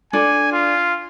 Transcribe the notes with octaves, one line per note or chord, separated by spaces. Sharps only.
D4 A4 G#5
F4